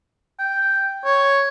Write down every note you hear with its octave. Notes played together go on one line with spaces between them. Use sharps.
G5
C#5